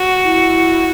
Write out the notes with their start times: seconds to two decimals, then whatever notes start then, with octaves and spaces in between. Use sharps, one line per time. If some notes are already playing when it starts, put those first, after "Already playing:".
Already playing: F#4
0.24 E4